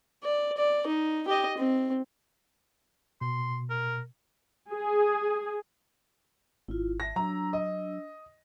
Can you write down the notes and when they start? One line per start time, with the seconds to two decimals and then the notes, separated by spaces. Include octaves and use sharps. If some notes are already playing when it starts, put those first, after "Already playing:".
0.24 D5
0.57 D5
0.86 D#4
1.28 G4 D#5
1.58 C4
3.21 B2 C6
3.70 A#4
4.71 G#4
6.68 G#1 E4 F4
7.00 E5 A5 A#6
7.16 F#3 D4 A#5 E6
7.53 D#5